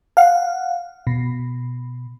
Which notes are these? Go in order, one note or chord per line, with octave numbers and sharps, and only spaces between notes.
F5 F#5
B2